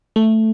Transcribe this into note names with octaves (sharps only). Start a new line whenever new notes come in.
A3